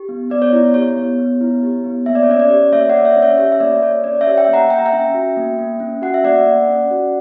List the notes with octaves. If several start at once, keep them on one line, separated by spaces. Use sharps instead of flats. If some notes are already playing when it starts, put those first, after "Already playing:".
Already playing: G4
B3
B3 D5
C#5
E4
G4 C#5
B3
B3
E4
G4
B3
A#3 E5
D5
C#5
C#4 D5
D5
G4
A#3 C#5 E5
A#3 D5 F#5
C#5 E5
C#4
C#5 E5
G4 C#5 E5
E5
A#3 D5
A#3 C#5
C#4 D5
C#5 E5
G4
E5 G5
A#3
F#5 A#5
A#3 G5
A#5
E5 G5
C#4
F#4
A#3
A#3
C#4
F#4 F#5
E5
A#3 D5 F#5
A#3
C#4
F#4